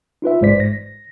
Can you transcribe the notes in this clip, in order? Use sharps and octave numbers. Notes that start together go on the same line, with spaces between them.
D#4 F4 B4 E5
A1 G#2 G#3 C5 D5 B6
A#6